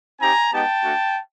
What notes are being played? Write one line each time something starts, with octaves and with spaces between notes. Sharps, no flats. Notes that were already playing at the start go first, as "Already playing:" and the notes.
C4 D#4 G4 G#5 A#5
G#3 B3 D#4 G4 G5 A5
A3 D4 F#4